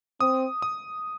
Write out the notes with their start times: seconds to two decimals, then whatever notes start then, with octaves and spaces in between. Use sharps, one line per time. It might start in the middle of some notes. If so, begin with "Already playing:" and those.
0.20 C4 D#6
0.62 D#6